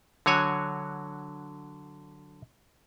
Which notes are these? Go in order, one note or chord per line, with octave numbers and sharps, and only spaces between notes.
D3 F#3 F#4 C#5 G#5